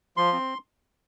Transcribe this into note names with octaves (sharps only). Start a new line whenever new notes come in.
F3 C6
C4